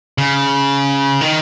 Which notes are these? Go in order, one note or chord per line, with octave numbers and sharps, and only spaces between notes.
C#3
D#3